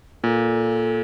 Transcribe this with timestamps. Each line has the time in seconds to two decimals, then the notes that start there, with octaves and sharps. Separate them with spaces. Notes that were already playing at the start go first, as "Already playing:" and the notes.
0.24 A#2 A4